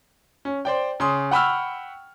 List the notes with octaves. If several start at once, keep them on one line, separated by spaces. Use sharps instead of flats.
C#4
C5 D5 G5
C#3 C6 D#6
F#5 G5 B5 C#6 E6 F6